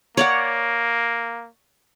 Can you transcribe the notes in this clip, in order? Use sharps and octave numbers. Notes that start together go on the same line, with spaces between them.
A#3 C#5 D5 F#5